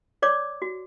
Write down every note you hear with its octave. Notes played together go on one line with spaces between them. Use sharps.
C#5 D5 D6
F#4